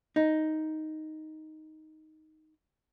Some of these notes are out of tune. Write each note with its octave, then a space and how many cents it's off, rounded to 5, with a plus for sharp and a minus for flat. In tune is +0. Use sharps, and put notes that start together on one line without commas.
D#4 +5